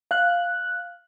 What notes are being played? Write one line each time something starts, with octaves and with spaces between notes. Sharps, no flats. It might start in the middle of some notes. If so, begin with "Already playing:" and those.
F5 F#6